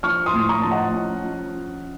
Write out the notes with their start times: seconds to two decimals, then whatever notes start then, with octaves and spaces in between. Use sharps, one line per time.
0.03 F3 C#6 F6
0.26 C6 D#6
0.34 A2
0.49 A#5 C#6
0.62 F3 A5
0.71 D#5 F#5
0.94 C#4
1.24 F3
1.55 C#4